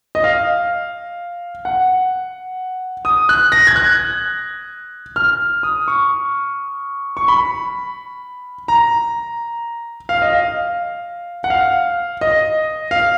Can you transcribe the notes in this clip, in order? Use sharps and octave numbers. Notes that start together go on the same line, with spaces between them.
D#5
F5
F#5
D#6
F#6
A#6
G#6
F#6
F6
D#6
C#6
C#6
B5
A#5
F5
D#5
F5
F#5
F5
D#5
F5